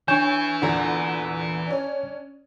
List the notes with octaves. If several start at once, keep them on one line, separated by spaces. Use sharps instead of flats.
E3 D4 C#5 G#5 C#6 G6 E7
E2 A#2 D3
C#4 D4